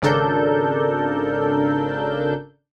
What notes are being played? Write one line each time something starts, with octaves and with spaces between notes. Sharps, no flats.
G#1 C#3 D4 A4 A#4 G6